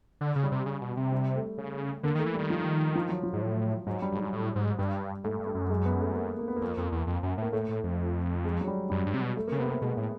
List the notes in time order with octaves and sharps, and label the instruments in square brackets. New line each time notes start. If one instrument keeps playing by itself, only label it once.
[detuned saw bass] D3
C#3
[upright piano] G3
[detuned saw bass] C3
C#3
B2
C3
[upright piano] G3
A3
[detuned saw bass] C#3
[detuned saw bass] D3 [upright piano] A#3
[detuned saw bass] D#3
[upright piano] A3
[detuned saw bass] E3
[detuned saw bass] D#3 [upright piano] G3
[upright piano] F3
F3
F#3
F3
[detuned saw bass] G#2
A2
[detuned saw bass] G#2 [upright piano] F#3
[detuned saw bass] G2 [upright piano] G3
[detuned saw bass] G2
[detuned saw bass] G#2 [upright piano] G3
[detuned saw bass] A2
G#2
[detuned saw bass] G2 [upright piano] G3
[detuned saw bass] G#2 [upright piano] A3
[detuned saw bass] G2
[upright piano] A3
[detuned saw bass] F#2
[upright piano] G#3
B3
A3
A#3
A#3
B3
[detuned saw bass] F2 [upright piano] A#3
[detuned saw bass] F2
E2
F2
F#2
[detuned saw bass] A2 [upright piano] A#3
[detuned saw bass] A2 [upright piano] A3
[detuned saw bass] A2
F2
[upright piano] G#3
F#3
G3
[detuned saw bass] F#2 [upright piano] G3
[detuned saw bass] G2
C3
B2
[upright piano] A3
A#3
[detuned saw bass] C#3
[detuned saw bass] C3 [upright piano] B3
[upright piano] A#3
[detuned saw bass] B2 [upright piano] G#3
[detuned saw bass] A2